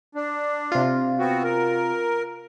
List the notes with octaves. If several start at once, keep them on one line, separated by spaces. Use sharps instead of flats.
D4
C3 F4
B3 C4 F#4
A#4